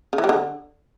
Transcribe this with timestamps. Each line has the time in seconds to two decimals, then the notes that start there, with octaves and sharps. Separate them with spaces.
0.13 C#3
0.18 E3
0.24 G3
0.29 D3